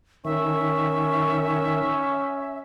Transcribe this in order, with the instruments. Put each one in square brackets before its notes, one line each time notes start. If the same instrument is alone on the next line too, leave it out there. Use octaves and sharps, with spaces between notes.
[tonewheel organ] D#3 [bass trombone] C#4 [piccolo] E5 [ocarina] C#6